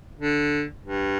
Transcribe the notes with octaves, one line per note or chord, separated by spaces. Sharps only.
D3
G2